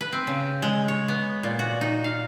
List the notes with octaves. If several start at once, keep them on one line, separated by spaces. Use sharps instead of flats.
B4
C4
C#3
G#3
C#5
B3
A#2
F#4
D#4
F5